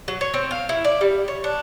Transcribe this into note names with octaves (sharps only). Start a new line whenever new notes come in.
F#3
C#5
C4
F5
E4
D5
G3
C#5
D4